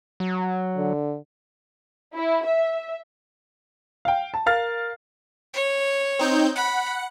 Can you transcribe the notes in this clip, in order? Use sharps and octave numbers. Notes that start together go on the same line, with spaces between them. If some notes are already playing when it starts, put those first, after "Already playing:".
F#3
D3
E4
E5
F5 G5
A5
A#4 F5 F6 A6
C#5
C4 D#4 G6
F#5 B5